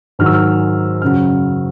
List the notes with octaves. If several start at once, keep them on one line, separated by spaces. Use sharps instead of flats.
G#2 D#3 F#3 F6
E6
F6
F#2 C#3 F#3 F6